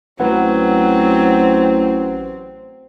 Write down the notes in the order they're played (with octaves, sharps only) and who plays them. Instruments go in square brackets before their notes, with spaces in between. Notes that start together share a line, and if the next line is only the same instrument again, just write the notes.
[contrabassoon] A1 [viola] F#3 [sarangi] C4 [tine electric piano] B4 F#5